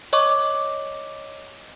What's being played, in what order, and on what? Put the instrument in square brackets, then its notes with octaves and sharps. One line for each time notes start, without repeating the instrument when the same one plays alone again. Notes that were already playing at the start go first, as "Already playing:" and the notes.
[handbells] C#5 D#5 C#6 D6